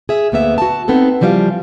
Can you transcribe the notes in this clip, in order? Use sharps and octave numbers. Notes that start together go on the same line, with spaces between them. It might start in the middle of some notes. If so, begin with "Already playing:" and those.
G#4 E5
D2 A#3 B3 E5
F#4 A5
B3 C4 D#4 A4
C#3 E3 F3 G3 E5 F5